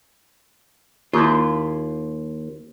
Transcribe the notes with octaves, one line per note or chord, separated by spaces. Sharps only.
D#2 E4 F4